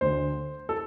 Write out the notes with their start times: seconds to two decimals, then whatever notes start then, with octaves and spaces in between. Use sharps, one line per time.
0.01 D2 D3 C5
0.69 A4